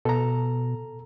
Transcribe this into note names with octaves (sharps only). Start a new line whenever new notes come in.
B2 A4 A#5